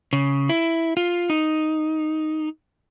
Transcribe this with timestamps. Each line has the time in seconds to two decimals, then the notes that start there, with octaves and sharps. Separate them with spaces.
0.13 C#3
0.49 E4
0.97 F4
1.30 D#4